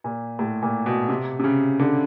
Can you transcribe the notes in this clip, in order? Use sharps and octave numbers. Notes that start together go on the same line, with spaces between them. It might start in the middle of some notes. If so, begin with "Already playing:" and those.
A#2
A2
A#2
B2
C3
C3
C#3
D3